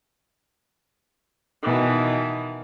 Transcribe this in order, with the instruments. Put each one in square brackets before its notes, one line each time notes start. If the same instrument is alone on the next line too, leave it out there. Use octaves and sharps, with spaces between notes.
[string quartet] B2 D#3 E3